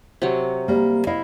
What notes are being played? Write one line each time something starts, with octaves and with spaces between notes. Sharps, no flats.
C3 F#3
G3 A#3
E4 D#5 F5